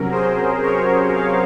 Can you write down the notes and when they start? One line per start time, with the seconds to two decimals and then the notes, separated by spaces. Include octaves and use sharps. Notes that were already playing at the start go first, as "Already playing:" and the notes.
Already playing: C3 F#3 C#4 A#4
0.11 G#4 C5
0.63 A#4 C#5
1.15 C#5 F5